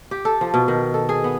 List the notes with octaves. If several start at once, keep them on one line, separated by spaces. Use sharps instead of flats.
G4
A4
F3
B2
D#3
A4
G#4
B3